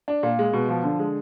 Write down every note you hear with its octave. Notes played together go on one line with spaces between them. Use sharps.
D4
A#2
G#3
B2
F3
D3
G#3